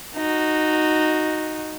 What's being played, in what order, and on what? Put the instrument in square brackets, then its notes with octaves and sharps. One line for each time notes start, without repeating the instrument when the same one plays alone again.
[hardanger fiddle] D#4 F#4